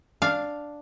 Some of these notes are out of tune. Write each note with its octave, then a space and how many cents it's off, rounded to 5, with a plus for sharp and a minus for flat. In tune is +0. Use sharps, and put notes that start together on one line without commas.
D4 +0 F5 +0